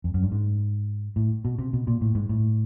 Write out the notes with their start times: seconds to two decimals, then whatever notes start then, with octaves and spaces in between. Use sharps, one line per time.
0.04 F2
0.14 F#2
0.23 G2
0.32 G#2
1.16 A2
1.45 B2
1.59 C3
1.73 B2
1.87 A#2
2.01 A2
2.15 G#2
2.29 A2